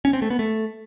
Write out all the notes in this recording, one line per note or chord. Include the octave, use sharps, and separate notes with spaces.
C#4
C4
A3
B3
A3